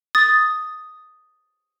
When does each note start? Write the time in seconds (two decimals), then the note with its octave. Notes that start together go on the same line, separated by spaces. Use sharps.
0.15 D#6 A6